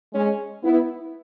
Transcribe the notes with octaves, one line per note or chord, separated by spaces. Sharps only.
G#3 C#4
B3 E4